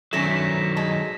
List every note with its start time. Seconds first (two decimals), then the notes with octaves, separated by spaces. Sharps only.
0.13 D#3 F#3 A3 C#4 D4 A#6 E7
0.31 B6
0.76 G#3 A5